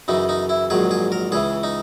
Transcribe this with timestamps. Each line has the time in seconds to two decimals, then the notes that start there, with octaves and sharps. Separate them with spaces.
0.08 F#2 C#3 E3 D#4
0.29 D#4
0.49 E4
0.70 A#1 G#2 D#3 F#3 G#4
0.91 G#4
1.12 A#4
1.32 C#2 C#3 E3 G#4
1.63 D#4